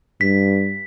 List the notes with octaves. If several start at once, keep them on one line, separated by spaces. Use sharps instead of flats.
G2 B6